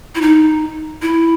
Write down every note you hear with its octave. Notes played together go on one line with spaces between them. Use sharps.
E4
D#4
E4